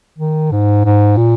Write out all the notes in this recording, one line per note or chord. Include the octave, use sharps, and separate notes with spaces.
D#3
G#2
G#2
A#2